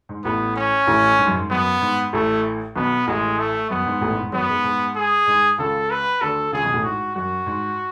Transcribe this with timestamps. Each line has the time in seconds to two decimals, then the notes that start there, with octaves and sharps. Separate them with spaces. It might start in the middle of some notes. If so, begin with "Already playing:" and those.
0.09 G#2
0.24 A1 A2 B3
0.56 C#4
0.87 A1 A2
1.19 G#2
1.27 F#2
1.34 G#2
1.50 F#2 B3
1.82 G#2
2.13 A1 A2 A3
2.76 B1 B2 B3
3.07 A1 A2 G#3
3.38 A3
3.70 F#2 B3
3.86 G#2
4.01 A1 A2
4.13 G#2
4.23 G#2
4.32 F#2 F#3 B3
4.49 G#2 G#3
4.64 G#2 G#3
4.95 G#4
5.27 G#2 G#3
5.58 C#2 C#3 A4
5.91 B4
6.21 D2 D3 A4
6.52 C#2 C#3 G#4
6.63 B1 B2
6.73 A1 A2
6.84 G#2 F#4
7.15 F#2 F#4
7.46 G#2